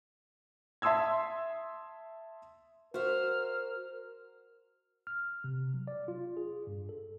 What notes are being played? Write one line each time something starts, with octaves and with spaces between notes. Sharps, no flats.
E5 A5 C6 D#6 E6 G#6
F#4 A#4 C5 E5 F6
F6
C3
F#3
D5
F4
G#4
G2
A4